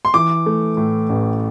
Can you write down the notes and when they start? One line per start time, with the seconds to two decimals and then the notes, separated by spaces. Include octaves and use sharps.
0.05 C6
0.14 E3 D6
0.46 A3
0.77 A2
1.09 A1